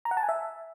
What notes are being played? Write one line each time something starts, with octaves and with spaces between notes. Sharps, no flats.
A#5
F#5
A5
G#5
E5